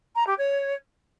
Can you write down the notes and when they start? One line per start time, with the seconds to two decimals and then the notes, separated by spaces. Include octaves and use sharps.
0.16 A#5
0.27 G4
0.38 C#5